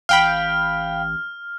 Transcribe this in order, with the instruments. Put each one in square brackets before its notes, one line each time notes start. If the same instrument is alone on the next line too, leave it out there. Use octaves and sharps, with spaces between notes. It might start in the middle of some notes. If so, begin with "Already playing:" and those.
[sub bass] A1 [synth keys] F5 G5 B5 [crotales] F6